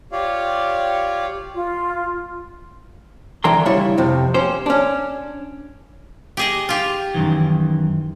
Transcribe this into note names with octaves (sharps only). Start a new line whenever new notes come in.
F4 G4 C#5 D5 F5
F4
D3 E3 G5 A#5 C6
C#3 G3 E4 C#5
F2 C3
C#4 G4 C5
C#4 D4
G4 G#4 D#5
F4 G4
F#2 D#3 E3